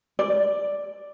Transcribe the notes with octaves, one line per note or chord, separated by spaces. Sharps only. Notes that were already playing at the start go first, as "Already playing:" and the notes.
D5